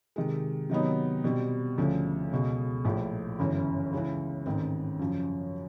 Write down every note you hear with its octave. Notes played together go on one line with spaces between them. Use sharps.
C3 D#3 G#3
C3 D#3 F#3 B3 D#4
B2 G3 C4
D2 C#3 F3
C#2 B2 G#3
A#1 A2 F3
G1 F#2 C#3 E3
C#2 C#3 E3
A1 G#2 D#3 G#3 C4
F#2 C#3 F3